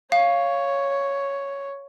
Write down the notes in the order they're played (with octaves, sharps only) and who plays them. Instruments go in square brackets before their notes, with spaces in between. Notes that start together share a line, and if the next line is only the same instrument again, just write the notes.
[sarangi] C#5 [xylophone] F5